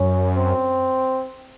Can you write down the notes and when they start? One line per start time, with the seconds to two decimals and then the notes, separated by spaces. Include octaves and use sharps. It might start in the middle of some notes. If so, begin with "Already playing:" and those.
Already playing: F#2 C#4
0.36 C4